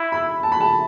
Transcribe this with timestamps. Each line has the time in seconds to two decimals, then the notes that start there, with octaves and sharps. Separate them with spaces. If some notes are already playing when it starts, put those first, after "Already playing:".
Already playing: E4
0.12 B5
0.43 A5
0.52 B5
0.61 A5